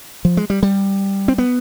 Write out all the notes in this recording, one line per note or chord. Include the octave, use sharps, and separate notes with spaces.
F3
G#3
G3
G3
C4
B3